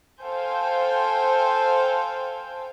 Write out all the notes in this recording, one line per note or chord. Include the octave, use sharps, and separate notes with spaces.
A4 C5 F5 G5 G#5 G6